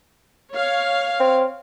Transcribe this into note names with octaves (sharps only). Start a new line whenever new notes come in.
C#5 F5
C4